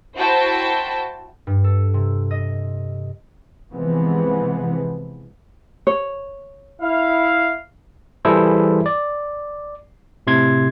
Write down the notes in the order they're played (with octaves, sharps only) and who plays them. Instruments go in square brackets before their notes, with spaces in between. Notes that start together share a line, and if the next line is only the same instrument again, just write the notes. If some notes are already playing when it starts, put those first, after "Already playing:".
[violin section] E4 F#4 C5 G5 A5
[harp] G2
A4
C3
D#5
[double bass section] C3 E3 F3 G#3 B3 C4
[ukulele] C#5
[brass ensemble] E4 F5
[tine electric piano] E3 G3 E4 G#4 A4 C5
D5
A2 C3 C6 G#6